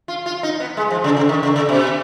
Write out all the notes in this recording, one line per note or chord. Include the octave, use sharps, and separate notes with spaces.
F4
F4
D#4
B3
G#3
F3
C#3
C#3
D#3
C#3
C#3
B2